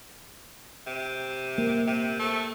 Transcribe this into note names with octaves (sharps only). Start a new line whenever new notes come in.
C3
A#3
C3
A3